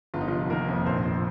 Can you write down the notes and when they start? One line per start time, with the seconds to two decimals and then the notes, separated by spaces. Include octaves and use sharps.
0.14 G1 F4
0.21 D#4
0.28 C3 F3 F4
0.50 D#3 A#3 A#4
0.68 F2
0.86 A#1 C4 C5
1.05 F3